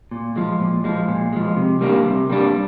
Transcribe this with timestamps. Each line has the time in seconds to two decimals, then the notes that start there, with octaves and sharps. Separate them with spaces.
0.11 A#2
0.36 F3 G#3
0.60 A#2
0.84 F3 G#3
1.08 A#2
1.33 F3 G#3
1.57 C3
1.81 G3 A#3 D4
2.05 C3
2.30 G3 A#3 D4